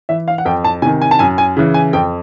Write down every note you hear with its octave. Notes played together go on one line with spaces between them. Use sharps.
E3 E5
F5
F#5
F2 G5
A5
C3 D#3 G#5
G#5
A5
F#2 G#5
G#5
C#3 E3
G#5
F2 G5